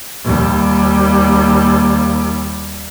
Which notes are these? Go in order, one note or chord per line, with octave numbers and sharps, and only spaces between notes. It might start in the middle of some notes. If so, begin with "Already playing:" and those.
D#2 G3